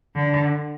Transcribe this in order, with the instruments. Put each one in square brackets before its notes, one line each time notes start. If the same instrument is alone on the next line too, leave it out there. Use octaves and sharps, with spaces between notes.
[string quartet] D3